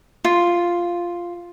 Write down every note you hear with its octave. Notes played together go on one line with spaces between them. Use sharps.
F4